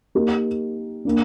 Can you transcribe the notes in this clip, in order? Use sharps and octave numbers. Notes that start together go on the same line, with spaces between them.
A#3 D#4 G4 A#4
A#3 D4